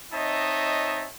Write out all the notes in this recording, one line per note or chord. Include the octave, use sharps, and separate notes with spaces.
C4 D#4 C#5 D#5 E5 A5